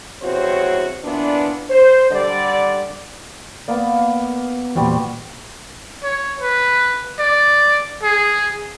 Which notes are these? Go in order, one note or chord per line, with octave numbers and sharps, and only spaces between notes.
E2 G2 C4 F#4 C5 C#5
A#2 E3 B3 D4
C5
D3 G3 D5
A#3 B3 D5
E2 A#2 G3 F#4 C5
C#5
B4
D5
G#4